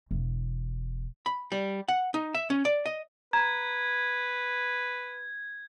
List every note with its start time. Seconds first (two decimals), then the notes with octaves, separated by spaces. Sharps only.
0.11 E1
1.26 B5
1.52 G3
1.88 F#5
2.14 D#4
2.34 E5
2.50 C#4
2.65 D5
2.86 D#5
3.33 B4 A#5 G#6